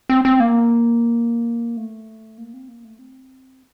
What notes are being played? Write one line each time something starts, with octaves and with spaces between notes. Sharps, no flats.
C4
C4
A#3
A3
A#3
C4
A#3
A3
C4